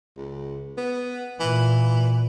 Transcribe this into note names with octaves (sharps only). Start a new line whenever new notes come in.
C#2
B3
A#2 E3